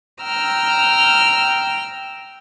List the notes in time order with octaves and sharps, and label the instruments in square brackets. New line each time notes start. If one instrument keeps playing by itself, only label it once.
[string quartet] G5 A#5 E6 F6